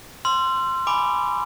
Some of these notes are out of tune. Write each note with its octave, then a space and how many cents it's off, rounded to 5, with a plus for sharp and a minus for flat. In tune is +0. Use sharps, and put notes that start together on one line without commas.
C6 +0 E6 +45
G#5 +5 B5 +0 D6 +0